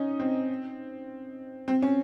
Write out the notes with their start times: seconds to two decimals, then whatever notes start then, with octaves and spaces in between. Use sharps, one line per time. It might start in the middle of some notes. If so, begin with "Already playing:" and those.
Already playing: C#4 D#4
0.20 C4
1.68 C4
1.82 C#4